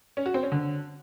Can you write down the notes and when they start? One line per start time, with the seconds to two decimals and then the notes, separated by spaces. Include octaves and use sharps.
0.17 C#4
0.26 F#4
0.34 C4
0.43 C#4
0.52 D3